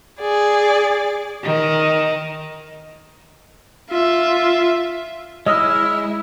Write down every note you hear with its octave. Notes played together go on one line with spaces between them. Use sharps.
G#4 D5
D#3
F4 E5
G#3 E4 C#5 D#5 E6 F6